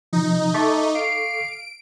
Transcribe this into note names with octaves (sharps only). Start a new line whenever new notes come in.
C3 F3 D#4
A3 A4 C#6 D6
F5 D7